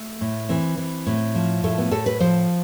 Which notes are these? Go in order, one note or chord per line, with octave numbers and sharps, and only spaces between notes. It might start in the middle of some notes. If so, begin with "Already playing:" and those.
Already playing: A3
A2
E3 C4
E3
A2
F3
A2 A3
B3
A2 A4
B4
F3 C5